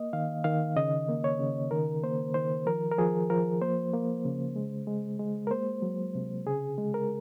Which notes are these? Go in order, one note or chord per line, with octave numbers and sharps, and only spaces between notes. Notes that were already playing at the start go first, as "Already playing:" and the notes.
Already playing: A#3 D#5
D#3 F5
D#3 F5
C#3 D#5
A#3
C#5
C#3
D#3 A#4
A#3 C5
D#3 C5
F3 A#4
A#4
F3 G#4
F3 A#4
A#3 C5
A#3
C#3
G#3
G#3
G#3
A#4
A#3 C5
F#3
C3
C#3 G#4
G#3
A#4